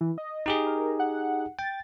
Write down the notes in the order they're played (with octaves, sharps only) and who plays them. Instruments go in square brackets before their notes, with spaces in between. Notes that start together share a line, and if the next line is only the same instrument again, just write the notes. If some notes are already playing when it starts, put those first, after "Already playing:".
[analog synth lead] E3
D#5
[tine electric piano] D#4 G4 G#4 [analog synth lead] D#5
[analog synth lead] A#4
F#5
[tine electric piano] G5 [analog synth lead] A6